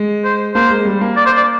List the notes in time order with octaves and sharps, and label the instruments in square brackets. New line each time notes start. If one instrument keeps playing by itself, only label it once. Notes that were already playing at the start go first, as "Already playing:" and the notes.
Already playing: [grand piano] G#3
[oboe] C5
[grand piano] A#3 [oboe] C5
[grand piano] G#3
G3
A#3
[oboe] D5
C5
D5